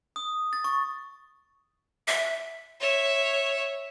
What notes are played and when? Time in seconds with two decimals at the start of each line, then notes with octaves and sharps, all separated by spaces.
0.16 D#6
0.53 A6
0.64 C#6
2.08 E5
2.81 C#5 E5